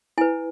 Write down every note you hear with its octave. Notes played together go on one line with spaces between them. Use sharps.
E4 B4 G#5